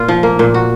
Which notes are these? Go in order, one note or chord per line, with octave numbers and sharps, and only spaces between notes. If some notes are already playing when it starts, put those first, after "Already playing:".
Already playing: A#2 F4
F3
A#3
A#2
F#4